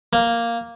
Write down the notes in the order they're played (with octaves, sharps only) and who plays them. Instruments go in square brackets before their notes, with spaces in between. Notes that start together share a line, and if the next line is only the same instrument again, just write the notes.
[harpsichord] A#3